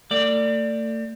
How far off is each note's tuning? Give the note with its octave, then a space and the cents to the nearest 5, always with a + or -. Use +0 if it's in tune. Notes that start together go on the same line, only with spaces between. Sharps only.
A3 +35 D5 +0